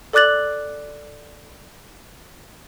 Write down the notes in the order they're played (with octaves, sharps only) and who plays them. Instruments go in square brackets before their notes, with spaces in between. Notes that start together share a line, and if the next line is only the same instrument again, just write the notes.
[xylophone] A4 D5 D6 F#6 A6 F#7